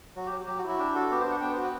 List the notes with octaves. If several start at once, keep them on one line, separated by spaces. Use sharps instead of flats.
F#3 F#4
G4
F#3
F#3 G4
F#4
E4
F#4
D4 G4
F#4 A4
B3 G4
D4 C5
F#5
B3 G5
F#4 C5
B4